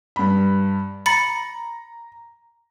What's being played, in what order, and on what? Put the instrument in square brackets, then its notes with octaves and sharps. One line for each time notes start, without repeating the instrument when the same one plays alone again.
[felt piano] G2 B5
[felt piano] A#5 [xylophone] B5 A6 C#7